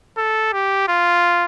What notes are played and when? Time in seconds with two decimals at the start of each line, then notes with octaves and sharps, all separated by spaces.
0.17 A4
0.53 G4
0.88 F4